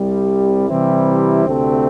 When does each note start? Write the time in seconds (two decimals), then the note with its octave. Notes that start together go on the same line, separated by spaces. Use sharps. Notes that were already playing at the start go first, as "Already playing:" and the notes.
Already playing: C2 C3 G3
0.68 C3 E3 G3 C4 E4
1.45 D2 C3 A3 C4